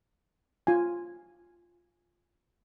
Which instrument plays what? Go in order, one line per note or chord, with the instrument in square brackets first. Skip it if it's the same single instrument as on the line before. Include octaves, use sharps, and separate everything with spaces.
[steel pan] F4 G#5